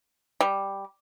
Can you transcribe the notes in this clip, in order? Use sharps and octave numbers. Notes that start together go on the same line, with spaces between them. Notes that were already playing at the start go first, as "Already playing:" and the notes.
G3